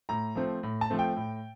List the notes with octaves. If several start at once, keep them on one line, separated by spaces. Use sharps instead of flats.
A2 A#5
F3 A3 C4
A2
A5
F3 A3 C4
G5
A2